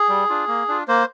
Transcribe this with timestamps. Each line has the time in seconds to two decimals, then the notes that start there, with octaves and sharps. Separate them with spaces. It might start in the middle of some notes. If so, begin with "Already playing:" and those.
Already playing: G#4
0.09 G3
0.29 D4 F4
0.48 A#3
0.68 D4 F4
0.88 A#3 C5